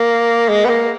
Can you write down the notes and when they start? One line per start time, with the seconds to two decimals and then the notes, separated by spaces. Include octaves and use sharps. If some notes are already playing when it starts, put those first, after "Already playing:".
Already playing: A#3
0.49 G#3
0.65 B3
0.69 A#3